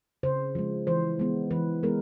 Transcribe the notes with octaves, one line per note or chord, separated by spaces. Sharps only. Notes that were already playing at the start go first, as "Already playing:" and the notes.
C#3 C5
F3 G#3
E3 C5
G#3 B3
E3 B4
G#3 B3 A#4